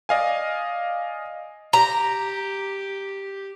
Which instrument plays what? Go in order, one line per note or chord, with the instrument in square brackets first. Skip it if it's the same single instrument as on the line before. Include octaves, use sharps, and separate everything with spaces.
[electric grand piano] D5 D#5 F5 G#5
[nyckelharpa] G4 [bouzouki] A#5